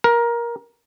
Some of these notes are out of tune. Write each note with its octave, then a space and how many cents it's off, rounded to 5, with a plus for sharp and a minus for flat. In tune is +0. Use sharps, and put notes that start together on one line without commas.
A#4 +15